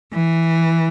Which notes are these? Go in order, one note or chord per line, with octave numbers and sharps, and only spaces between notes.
E3